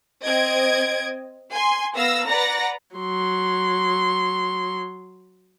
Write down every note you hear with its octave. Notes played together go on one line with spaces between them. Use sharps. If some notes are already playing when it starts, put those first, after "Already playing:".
C4 D#5 G#6 D7
G#5 C6
B3 F5 E6 A#6
B4 D5 F#5 A#5 A#6
F#3 C6